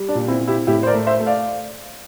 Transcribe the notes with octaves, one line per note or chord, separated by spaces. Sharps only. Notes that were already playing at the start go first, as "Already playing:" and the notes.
Already playing: G3
D4
A#2
C4 E4
C4
E4 G4
A2 E4 G4
C5
A#4 D5
A3
C5 E5
A3
D5 F5